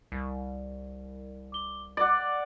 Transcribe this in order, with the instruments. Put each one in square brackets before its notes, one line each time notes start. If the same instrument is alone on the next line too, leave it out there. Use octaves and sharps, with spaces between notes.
[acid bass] C2
[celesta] D6 G7
[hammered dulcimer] D5 F#5 [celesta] D6